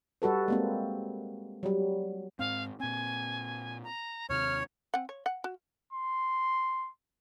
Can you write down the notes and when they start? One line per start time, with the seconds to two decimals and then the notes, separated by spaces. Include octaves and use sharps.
0.22 G3 F#4 A4 B4
0.48 G#3 A#3 C4
1.63 F#3 G3
2.39 G#2 C4 F5
2.80 A#2 C4 G#5
3.83 A#5
4.30 D#2 C3 C#5 F6
4.94 C4 F#5
5.09 C#5
5.26 F#5
5.44 F#4
5.93 C6